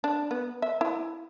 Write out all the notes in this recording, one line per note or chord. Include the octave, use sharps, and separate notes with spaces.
D4
B3
E5
E4